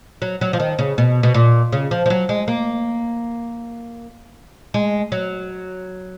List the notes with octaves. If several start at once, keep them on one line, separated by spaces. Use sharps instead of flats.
F#3
F#3
F3
D#3
C#3
B2
B2
A#2
C#3
F3
F3
F#3
G#3
A#3
G#3
F#3